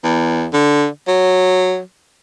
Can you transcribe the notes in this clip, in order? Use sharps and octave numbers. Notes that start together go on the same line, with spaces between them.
E2
D3
F#3